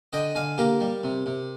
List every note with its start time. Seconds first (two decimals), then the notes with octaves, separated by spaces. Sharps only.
0.13 D3 D#5 G5
0.35 D3 F5 G#5
0.58 A#3 G4 A#4
0.80 G3
1.04 C3
1.26 C3